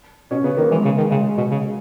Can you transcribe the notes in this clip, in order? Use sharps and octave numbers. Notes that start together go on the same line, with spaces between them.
B2 C#4
C#3 B3
D#3 A#3
E3 G#3
C#3
D#3
C#3 G#3
B2
C#3